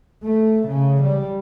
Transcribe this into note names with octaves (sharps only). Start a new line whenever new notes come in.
A3
C#3
G3